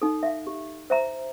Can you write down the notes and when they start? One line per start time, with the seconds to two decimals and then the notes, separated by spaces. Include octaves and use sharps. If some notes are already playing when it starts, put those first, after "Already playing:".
0.02 D#4 A4
0.23 E5 F5
0.47 G4
0.90 C5 E5 A#5